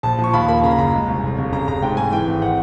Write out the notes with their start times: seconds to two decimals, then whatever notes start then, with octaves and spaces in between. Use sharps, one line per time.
0.03 A#1 A5
0.18 F3
0.24 C#6
0.33 D#2 B5
0.48 A#3 B5
0.63 C#3 A#5
0.71 B5
0.78 F#1 A#5
0.93 G#3
1.08 C2
1.23 F1
1.38 F1
1.52 C#3 A#5
1.68 F1 A#5
1.82 G#2 G5
1.97 G#2 G#5
2.12 E3 G5
2.27 G#1
2.42 F#5